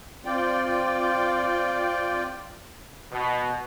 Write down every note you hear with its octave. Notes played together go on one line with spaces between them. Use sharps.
C4 F4 D5 G5
B2